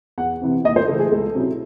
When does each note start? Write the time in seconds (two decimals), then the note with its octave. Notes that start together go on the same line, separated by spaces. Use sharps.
0.18 E2 F#5
0.41 C3 E3 C4
0.64 D#2 D#5
0.76 C5
0.88 C#3 E3 A3 A4
0.99 G#4
1.12 C#2 A4
1.35 C3 F#3 C#4 E4